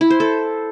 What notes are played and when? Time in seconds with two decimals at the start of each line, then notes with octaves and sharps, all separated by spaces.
0.01 E4
0.10 C5
0.20 A4